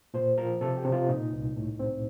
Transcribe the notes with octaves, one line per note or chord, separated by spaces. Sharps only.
A#2 C5
F3 A#4
C3 A4
G4
C3
F4
A#2 D#4
C2
A2
C4